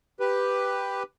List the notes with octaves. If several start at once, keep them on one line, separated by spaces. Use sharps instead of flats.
G4 B4